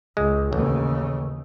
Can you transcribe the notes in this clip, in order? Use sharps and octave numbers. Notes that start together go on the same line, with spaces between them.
C#2 G#3
A1 D#2 C#3